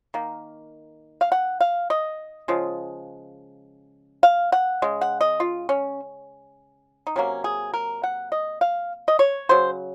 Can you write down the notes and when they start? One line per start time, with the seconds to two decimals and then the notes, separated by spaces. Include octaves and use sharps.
0.14 D#3 A#3
1.21 F5
1.32 F#5
1.61 F5
1.90 D#5
2.48 C#3 F3 G#3
4.23 F5
4.52 F#5
4.82 C#3 G#3
5.01 F#5
5.21 D#5
5.40 F4
5.69 C#4
7.07 D#4
7.16 C3 F#3 A#3 C#4
7.44 G#4
7.74 A#4
8.03 F#5
8.32 D#5
8.61 F5
9.08 D#5
9.19 C#5
9.49 C#3 F#3 C5